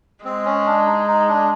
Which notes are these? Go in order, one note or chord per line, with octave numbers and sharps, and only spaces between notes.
G#3 C4
C#4
D4
D#4
D#4
D4